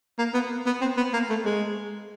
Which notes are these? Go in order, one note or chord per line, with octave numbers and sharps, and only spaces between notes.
A#3
B3
B3
C4
B3
A#3
A3
G#3